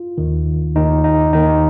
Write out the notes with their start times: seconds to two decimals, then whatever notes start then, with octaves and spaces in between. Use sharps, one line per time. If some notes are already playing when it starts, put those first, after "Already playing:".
Already playing: F4
0.18 D#2 D#3
0.75 D#2 D#3 D#4
1.04 D#4
1.33 D#2 D#3 D#4